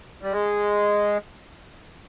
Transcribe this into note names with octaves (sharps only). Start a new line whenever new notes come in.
G3
G#3